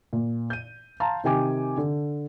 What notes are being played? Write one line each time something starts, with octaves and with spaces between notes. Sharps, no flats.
A#2
G6 D#7
F5 A5 A#5 C6
C3 D#3 G4 G5 G#5 D6
D3